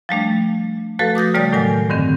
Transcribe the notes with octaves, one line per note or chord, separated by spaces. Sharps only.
F3 G3 A3 D4
F3 A3 F#4 A4 B4
D6 D#6 G6 A#6
C#3 G3 A3 D5 A6
A2 D#3 F#3 A#4 G#5
G2 D3 D#3 C4